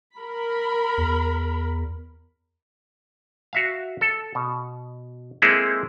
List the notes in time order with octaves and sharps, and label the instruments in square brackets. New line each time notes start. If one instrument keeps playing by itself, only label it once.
[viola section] A#4 B5
[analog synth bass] E2
[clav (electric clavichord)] F#4 E5 F5
A4
B2
G#3 A#3 C4 E4 G#4 A4